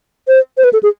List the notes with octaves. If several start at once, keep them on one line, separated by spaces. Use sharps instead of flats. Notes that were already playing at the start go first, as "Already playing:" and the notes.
C5
C5
B4
A4
G#4